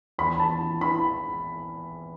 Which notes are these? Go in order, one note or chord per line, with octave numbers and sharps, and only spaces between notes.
E2 B5
E2 A5
E3
E3 B5